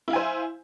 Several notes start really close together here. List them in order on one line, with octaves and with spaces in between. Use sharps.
E4 F5 G#5 C5